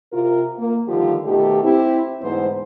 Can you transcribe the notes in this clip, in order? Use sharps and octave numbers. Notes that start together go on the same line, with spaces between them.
C3 F4 A#4
A#3
D3 D#3 F3 G3 F4 G4
B2 D#3 A3 G4
C4 E4 G4
D2 G#2 E3 B3 C5